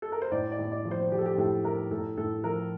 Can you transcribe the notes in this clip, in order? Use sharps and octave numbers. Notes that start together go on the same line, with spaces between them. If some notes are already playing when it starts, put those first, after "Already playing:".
A4
A#4
C5
A2 D5
D5
A2
D5
F3
C5
F3 G4
A4
G4
A2 A4
A2 A#4
A2 A4
A2 A4
F3 A#4